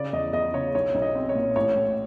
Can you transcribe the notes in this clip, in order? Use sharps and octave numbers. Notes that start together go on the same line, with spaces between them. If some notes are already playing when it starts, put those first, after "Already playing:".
Already playing: C#3 D5
E2 D#5
E2 D#5
C#3 C#5
B1 C#5
B1
D#5
C4
C#5
A#2
A1 C#5
A2